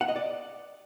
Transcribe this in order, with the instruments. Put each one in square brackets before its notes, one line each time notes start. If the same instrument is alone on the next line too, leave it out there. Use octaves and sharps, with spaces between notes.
[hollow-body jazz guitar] F#5
D#5
D5